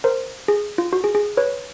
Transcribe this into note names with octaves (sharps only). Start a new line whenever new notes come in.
A#4 C5
G#4
F4
F#4
G#4
G#4
B4 C#5